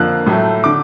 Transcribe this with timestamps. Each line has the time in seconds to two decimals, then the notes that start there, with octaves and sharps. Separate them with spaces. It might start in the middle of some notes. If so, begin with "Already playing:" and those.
Already playing: F2 D3 A#3 F#6
0.26 A2 F#3 A3
0.64 D3 D6